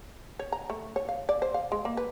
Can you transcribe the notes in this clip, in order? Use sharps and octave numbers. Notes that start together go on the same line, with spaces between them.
C#5
A#5
A3
C#5
F5
D5
C5
F5
G#3
A#3
B4